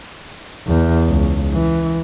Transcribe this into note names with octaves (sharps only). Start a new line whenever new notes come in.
E2
C#2
E3